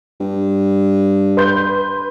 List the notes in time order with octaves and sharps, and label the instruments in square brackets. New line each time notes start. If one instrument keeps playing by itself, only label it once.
[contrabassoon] G2
[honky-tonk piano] B4 C6 G6